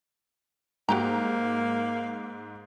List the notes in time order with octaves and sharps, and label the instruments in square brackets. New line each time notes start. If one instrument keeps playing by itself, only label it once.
[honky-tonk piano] G#2 [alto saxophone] A#3 [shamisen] F#4 G4 A#5